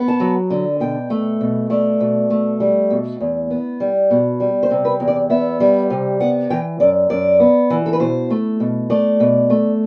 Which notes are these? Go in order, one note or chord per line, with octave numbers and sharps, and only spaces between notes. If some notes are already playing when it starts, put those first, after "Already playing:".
Already playing: B3
A5
F#3
D3
B2 G5
A3
B2
A3 D5
B2
A3
G3
B2
E2
B3
G3
B2
G3
C5
C3
B4
E2
D5
B3 E5
G3
C3
B3 F#5
E3 G5
F#2 D5
F#2 D5
B3
E3
A4
B4
B2 C5
A3
B2
A3 D5
B2
A3